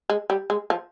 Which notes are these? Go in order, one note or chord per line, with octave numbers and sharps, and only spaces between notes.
G#3
G3
G#3
F3